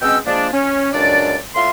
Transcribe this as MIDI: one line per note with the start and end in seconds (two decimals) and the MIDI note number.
0.02 0.17 47
0.02 0.17 56
0.02 0.17 60
0.02 0.17 61
0.02 0.17 79
0.02 0.17 88
0.26 0.48 53
0.26 0.48 56
0.26 0.48 58
0.26 0.48 62
0.52 0.92 61
0.93 1.36 37
0.93 1.36 42
0.93 1.36 62
0.93 1.36 74
1.55 1.70 45
1.55 1.70 65
1.55 1.70 76
1.55 1.70 84